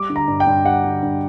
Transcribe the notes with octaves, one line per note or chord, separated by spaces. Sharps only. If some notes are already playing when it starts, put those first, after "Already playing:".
Already playing: G3 D6
D3
A#5
G2
G5
G2
G3 F#5
D3
G2